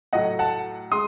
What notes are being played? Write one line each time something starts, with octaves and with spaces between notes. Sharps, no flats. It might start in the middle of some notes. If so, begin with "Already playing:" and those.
A2 F#3 A3 D#5 F#5
F#5 A5
G#3 C6 D#6